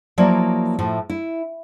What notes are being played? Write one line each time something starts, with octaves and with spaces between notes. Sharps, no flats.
F3 F#3 A#3 E4 D5
A2 F3 A3
E4